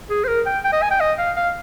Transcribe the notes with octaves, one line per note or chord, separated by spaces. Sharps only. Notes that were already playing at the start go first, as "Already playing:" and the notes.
G#4
C5
A#4
G5
G5
D#5
G#5
G5
D#5
F5
F5